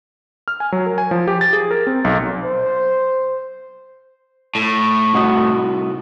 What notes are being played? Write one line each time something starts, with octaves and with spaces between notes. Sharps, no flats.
F6
G#5
F#3
A#4
G#5
F3
G4
A6
G#4
A#4
C4
B1
C5
A2
C2 F#4 D#5